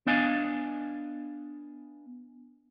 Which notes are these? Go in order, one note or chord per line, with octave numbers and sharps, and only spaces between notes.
B3 D4 D#5 F5 G#5